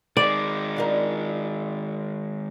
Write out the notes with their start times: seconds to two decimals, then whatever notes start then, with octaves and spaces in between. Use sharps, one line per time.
0.17 D#3 G#3 D5
0.76 D4 F4 A#4